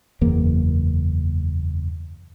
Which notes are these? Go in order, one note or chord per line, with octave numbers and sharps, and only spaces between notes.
F#1 E2 A#3